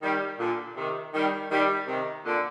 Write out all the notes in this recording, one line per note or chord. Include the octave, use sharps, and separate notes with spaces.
D#3 G3
A#2 D3
C3 D#3
D#3 G3
D#3 G3
C3 D#3
A#2 D3